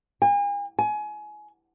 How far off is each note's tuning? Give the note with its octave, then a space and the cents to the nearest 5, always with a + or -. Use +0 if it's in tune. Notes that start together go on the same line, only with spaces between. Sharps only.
G#5 -40
G#5 +25